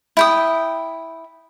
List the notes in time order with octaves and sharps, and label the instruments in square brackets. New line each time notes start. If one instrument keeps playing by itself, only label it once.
[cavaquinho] E4 G5 D#6